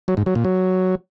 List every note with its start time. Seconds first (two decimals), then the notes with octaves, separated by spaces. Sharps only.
0.08 F#3
0.17 G#2
0.26 F#3
0.35 A#2
0.45 F#3